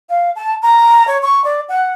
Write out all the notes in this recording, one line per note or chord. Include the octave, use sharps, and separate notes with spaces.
F5
A5
A#5
C#5
C#6
D5
F#5